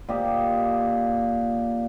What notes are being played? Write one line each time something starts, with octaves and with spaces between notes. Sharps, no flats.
A#2 G4 D#5